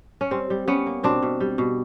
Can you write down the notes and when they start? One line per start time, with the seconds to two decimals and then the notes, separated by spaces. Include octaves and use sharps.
0.21 C#4
0.31 G3 C4
0.50 G3
0.68 G3 B3 C#4
0.86 A#3
1.03 B2 C4 D4
1.23 B2
1.40 G3
1.58 B2